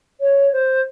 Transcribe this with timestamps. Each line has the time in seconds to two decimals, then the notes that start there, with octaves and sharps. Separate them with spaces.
0.20 C#5
0.52 C5